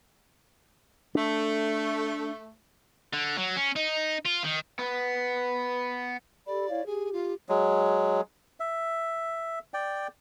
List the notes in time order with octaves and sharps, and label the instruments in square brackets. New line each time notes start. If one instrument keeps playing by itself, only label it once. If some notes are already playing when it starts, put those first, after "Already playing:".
[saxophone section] A3 [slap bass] D4
[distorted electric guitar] D3
F#3
C#4
D#4
F4
D#3
[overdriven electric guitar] B3
[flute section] G4 A4 B5 [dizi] D5
[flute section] E4 C#5 F5
[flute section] G4 [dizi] G#4
[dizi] F4
[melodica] F#3 G#3
E5
D5 G5